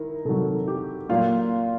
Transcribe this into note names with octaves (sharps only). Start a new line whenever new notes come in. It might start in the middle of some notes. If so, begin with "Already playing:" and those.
Already playing: D#3 E4 A#4
C3 D#3 F#3 A4
G4
A#2 F#3 F4